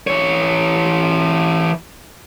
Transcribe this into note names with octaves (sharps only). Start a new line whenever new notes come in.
E3 C#5